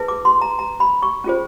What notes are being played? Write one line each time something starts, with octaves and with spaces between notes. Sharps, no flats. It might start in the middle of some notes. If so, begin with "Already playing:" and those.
Already playing: E4 G#4 B4
D6
C6
A#5
A#5
B5
C#6
C#4 F4 G#4 C5